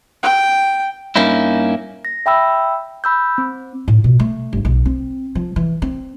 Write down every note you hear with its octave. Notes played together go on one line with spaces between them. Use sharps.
G5
G2 A#3 C#4 D#4 E4
A#6
E5 G5 B5 E6
B5 E6 G6
C4
A2
B2
A3
G1
B1
C4
F3
E3
C4